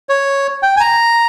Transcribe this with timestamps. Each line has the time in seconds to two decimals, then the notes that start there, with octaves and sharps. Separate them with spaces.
0.09 C#5
0.63 G5
0.77 G#5
0.81 A#5